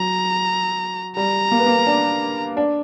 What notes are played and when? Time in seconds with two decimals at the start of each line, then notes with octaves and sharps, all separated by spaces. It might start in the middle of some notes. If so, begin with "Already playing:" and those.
Already playing: F#3 A#5
1.16 G3 A#5
1.52 A#3
1.59 B3
1.66 A#3
1.87 D4
2.57 D4